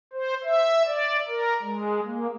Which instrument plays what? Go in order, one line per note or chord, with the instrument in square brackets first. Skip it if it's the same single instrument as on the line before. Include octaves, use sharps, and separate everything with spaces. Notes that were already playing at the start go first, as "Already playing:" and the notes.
[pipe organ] C5
E5
D5
A#4
G#3
A#3